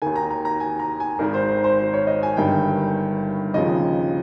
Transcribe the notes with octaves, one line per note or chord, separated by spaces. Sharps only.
D#2 D#3 G#5
A#5
A#5
A#5
G#5
A#5
G#5
G#1 G#2 D#3 A#4
C5
C5
C5
C5
C#5
D#5
G#5
G1 G2 D#3 G5
D#2 C#3 F3 D#5